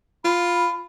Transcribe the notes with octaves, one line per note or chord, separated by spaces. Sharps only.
F4 B5